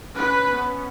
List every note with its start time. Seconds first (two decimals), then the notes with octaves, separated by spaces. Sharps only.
0.14 C#4 B4
0.49 B3